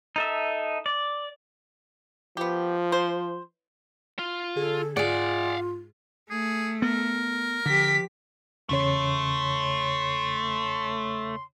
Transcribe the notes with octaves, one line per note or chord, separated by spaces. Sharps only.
D#4 A4 E5
D5
F3 B3 G4
C5
F4
D3 G#4 A4
G#2 F4 G#4 D5 F5 F#5
A3 G#4
B3 A#4
D3 F3 G4 B6
E2 C#3 A3 C#5 C6